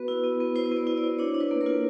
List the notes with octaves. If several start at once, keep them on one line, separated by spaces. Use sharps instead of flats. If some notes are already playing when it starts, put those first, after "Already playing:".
Already playing: B3 F#4 B4
E4
B3
B3
E4 C5
B3 D5
E4
D5
E4
D4 C#5
D4
B4
A#3
A#4
F4